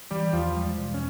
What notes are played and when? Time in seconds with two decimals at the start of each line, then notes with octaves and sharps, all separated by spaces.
0.11 E3 G3 G4
0.33 E2 F3 F4
0.56 G#3
0.79 E1
0.94 C#4